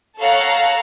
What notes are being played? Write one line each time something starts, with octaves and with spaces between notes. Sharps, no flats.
A4 C#5 F5 F#5 A#5